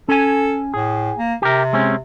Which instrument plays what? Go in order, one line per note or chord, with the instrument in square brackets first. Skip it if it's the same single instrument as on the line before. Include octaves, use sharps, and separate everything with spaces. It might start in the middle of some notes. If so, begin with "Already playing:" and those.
[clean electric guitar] C#4 G#5 [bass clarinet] A4
[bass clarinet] A2 [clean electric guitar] G#4
[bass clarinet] A#3
[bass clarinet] C3 [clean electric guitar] G4 A#4
[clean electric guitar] G#3 C4 C#4